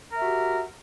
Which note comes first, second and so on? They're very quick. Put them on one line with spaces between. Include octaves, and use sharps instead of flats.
A#4 E5 F#4 G4